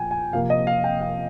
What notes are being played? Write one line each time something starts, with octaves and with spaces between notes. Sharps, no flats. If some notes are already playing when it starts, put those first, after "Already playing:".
Already playing: A#2 F3 G5 G#5
G#5
C3 F3 A#3 F5
D#5
F5
G5
F5